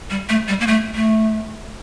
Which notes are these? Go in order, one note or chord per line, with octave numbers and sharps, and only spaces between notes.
G3
A3
G3
A#3
A3
A3